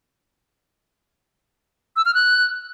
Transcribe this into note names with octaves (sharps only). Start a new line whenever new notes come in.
E6
F6
F#6